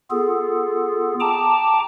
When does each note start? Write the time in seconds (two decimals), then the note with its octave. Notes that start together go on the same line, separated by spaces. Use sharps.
0.11 B3 F4 G#4 A4
1.20 G5 A5 A#5 D6